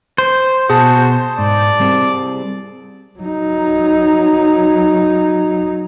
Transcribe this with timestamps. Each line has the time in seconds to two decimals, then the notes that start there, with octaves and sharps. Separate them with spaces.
0.18 C5
0.70 B2 F#4 G#4 A5
1.39 G#2 D5
1.80 G3 C4
3.19 F#3 D#4